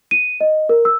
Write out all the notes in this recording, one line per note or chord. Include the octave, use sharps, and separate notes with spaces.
D#7
D#5
A#4
E6